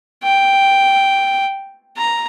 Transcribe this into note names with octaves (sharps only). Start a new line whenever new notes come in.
G5
A#5